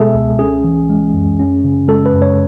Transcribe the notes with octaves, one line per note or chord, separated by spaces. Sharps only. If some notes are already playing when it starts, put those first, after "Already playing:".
Already playing: B2 G#3 B3 G#4 A4 E5
C#2
C#4 G#4
E3
G#3
F#2
C#4
C#3
G#3 A4
B4
F#2
C#5